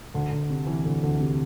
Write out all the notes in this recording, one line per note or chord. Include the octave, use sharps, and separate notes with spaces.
D2
D2
C3
E3
D2
D2
C3